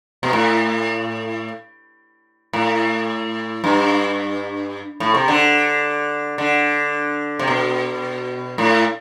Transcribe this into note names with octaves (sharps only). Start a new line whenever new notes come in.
B2
A2
A2
G2
A2
C3
D3
D3
C3
B2
A2